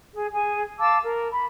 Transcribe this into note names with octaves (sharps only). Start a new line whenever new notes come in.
G#4
G#4 G#5
F5 A5 D6 E6
A#4
B5